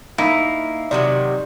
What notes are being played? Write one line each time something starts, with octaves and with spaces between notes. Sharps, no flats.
A#3 D#4 E4
C3 D#3 F#3 D5